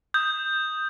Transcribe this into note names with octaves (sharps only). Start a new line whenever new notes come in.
D#6 G6